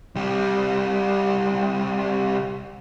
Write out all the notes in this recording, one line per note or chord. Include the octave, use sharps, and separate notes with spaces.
C2 G3